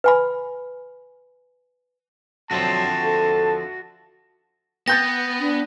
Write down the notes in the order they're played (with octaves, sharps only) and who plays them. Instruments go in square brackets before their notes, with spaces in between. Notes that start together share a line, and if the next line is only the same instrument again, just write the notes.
[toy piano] B4 G#5 B5
[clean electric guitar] D3 F3 C4 [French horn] F#3 [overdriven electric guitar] F#4 E5 [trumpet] A5
[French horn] A4
[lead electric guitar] B3 [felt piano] G5 G6 A6 [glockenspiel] A#6
[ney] D4